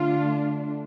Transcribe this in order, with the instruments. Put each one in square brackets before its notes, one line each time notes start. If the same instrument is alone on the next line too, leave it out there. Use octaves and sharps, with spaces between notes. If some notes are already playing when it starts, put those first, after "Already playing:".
Already playing: [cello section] D3 A3 D4 F4